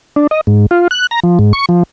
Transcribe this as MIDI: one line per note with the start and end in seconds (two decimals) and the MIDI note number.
0.16 0.27 62
0.31 0.41 75
0.47 0.66 44
0.71 0.88 65
0.91 1.07 90
1.11 1.20 82
1.24 1.39 53
1.39 1.53 44
1.53 1.66 85
1.69 1.83 53